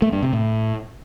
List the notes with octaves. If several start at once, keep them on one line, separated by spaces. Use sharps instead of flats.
A3
G2
C3
A2